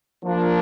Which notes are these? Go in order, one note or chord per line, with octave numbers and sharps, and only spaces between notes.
F3 A#3 D4